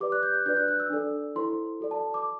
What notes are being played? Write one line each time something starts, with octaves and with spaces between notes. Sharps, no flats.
G4 B4 D5 D6
F#6
G6
F#6
D4 F#4 B4 D5 G6
F#6
F#6
E6
D4 A4 D5
E4 A4 C5 C6
F#4 A4 D5
A5
D6